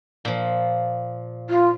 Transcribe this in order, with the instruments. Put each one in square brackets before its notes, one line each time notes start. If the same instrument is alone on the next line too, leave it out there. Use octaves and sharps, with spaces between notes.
[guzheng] A#2 F3
[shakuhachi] F4